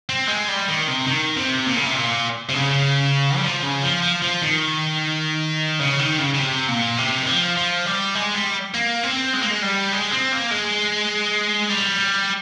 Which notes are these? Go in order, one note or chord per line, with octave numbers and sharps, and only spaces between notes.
C4
G#3
G3
D#3
C3
D#3
C3
A#2
C#3
C3
A#2
C3
C#3
G3
F3
C#3
F3
F3
F3
D#3
C#3
D#3
C#3
C#3
C3
A#2
C3
D#3
F3
F3
G3
G#3
G3
A#3
C4
G#3
A#3
G#3
G3
G#3
C4
A#3
G#3
G3